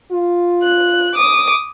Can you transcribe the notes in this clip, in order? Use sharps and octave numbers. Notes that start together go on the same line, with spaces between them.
F4
F#6
D6 D#6